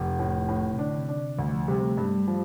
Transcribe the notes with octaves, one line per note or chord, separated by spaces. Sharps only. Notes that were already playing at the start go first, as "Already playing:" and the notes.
Already playing: F1 C3
A2
A2
C3
D3 D4
C3
D4
C3
D2 D3
F3
C3 G3
A3
G2 A3
G3
F3